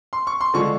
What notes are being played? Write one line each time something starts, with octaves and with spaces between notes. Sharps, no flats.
C6
C#6
C6
D3 F3 G#3 C#6